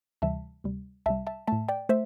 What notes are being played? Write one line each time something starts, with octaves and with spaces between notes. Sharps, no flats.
D2 C3 E3 G3 E5 A5
D2 C3 G3
C2 C3 G3 E5 A5
E5 A5
A2 A3 E5 A5
D5 G5
A3 C5 E5